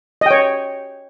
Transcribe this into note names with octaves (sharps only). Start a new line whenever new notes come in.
C#5 D#5 G5